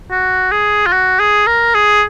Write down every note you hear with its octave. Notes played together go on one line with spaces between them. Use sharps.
F#4
G#4
F4
F#4
G#4
A#4
G#4